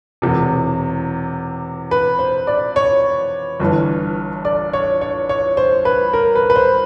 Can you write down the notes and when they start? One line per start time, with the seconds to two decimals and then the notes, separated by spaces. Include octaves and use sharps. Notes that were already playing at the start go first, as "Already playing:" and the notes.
0.22 E1 E2 C3
1.91 B4
2.19 C5
2.47 D5
2.76 C#5
3.60 G1 G2 E3
4.45 D5
4.73 C#5
5.01 C#5
5.29 C#5
5.57 C5
5.85 B4
6.13 A#4
6.36 B4
6.50 B4
6.56 C5